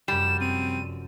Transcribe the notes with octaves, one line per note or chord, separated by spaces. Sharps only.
F1 F#2 G3 E7
C4 D#7